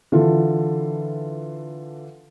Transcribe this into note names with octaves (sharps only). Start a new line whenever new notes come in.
D3 E3 F4 A4